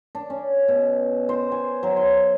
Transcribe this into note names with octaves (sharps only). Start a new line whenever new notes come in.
D4
C#4
B2
C5
G#5
F#3
C6